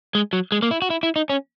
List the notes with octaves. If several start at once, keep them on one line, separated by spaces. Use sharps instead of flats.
G#3
F#3
G#3
A#3
E4
F#4
E4
E4
D#4
C#4